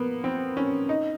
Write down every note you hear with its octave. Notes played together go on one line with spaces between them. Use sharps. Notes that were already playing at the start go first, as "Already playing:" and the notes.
Already playing: A#3 B3
C4
C#4
D#4